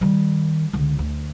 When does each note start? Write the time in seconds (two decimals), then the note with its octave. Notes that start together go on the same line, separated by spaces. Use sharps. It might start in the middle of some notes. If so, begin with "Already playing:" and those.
0.01 D#3 G3
0.73 C#2 D3
0.99 D2